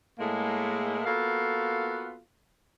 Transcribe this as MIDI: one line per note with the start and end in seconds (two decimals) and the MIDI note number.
0.19 1.02 45
0.19 1.02 56
0.19 1.02 58
1.06 2.19 58
1.06 2.19 59
1.06 2.19 65
1.06 2.19 66
1.06 2.19 69
1.06 2.19 77